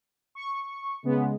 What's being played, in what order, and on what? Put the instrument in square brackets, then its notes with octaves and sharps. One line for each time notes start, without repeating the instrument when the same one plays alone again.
[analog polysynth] C#6
[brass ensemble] C#3 G#3 [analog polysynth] B3